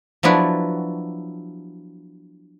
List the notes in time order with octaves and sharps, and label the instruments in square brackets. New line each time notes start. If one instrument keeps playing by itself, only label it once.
[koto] F3 F#3 B3 D4 E4 F#4